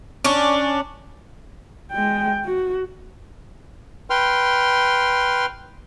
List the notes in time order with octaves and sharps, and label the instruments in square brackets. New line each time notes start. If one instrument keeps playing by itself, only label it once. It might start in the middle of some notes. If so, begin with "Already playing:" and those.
[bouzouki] C#4 D4
[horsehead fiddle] G#3 G5
F#4
[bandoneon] B4 G5 C6 F6